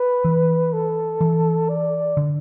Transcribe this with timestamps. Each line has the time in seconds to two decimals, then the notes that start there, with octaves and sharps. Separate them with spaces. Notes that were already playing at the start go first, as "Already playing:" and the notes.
Already playing: B4
0.24 E3
0.73 A4
1.21 E3
1.69 D5
2.17 D3